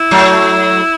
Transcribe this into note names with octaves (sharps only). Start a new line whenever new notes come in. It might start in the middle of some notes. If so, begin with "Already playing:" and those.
Already playing: E4
F#3 A3